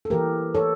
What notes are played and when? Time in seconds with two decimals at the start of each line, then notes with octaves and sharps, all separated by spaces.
0.05 A4
0.10 E3 A#3 G4 A#4
0.54 A4 C#5